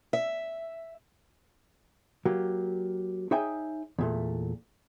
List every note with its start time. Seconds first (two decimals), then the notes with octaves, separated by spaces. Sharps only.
0.13 E5
2.25 F#3 A#3 G4
3.31 D#4 G#4 C#5 E5 G5 G#5
3.99 E2 A#2 A3